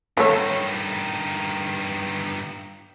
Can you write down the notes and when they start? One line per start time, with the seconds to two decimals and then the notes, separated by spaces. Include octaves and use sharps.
0.17 G2 D#3 F#3 A3 C#5